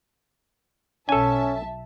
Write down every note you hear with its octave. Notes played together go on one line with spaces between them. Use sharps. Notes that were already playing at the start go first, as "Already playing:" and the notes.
B1 C#4 A4 E5 G#5 A5